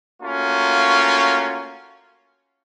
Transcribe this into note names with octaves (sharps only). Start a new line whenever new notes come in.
A3 A#3 C#4 F4 F#4